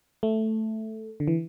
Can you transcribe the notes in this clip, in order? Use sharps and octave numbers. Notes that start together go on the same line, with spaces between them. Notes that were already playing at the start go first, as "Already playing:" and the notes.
A3
D3
E3